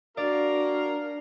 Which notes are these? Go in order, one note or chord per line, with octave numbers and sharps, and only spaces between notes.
D4 F#4 A#4 D5 F5 A#5